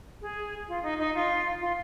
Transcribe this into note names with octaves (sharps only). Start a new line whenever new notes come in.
G#4
F4
D#4
D#4
F4
F4